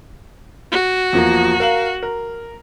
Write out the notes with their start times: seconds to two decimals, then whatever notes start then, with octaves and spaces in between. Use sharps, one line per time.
0.72 F#4
1.13 E2 F3 A#3
1.60 A#4 F5 F#7
2.03 A#4